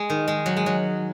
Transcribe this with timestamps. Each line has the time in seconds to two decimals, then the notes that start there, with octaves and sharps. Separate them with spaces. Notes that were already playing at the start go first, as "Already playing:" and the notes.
Already playing: G#3
0.10 D#3
0.28 G#3
0.46 F#3
0.57 G#3
0.66 F#3